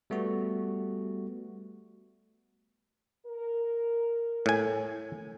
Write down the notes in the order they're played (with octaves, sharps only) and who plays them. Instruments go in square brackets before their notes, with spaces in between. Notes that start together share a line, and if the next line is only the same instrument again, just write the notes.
[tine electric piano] G3 A3 B3 F#4
[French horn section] A#4
[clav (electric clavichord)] A2 G#5